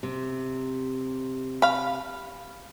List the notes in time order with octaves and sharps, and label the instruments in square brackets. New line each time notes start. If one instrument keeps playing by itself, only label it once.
[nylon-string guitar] C3
[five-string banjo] F5 B5